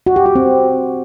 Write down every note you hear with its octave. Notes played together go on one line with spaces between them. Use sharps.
F#4
G4
F#4
C4